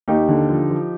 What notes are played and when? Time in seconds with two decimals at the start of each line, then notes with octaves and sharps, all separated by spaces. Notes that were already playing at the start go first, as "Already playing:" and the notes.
0.08 D#2 D#4 G4
0.28 D3
0.48 F3
0.70 F3